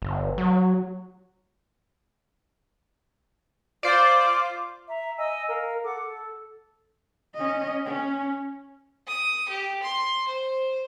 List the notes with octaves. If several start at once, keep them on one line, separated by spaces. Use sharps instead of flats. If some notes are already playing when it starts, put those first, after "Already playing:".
G1
F#3
F4 C5 D5 D6
E5 A#5
D#5 G#5 E6
A#4 F5
A4 F#5 D6
A4
C#4 D#5
C#4
D#6
G4
C6
C5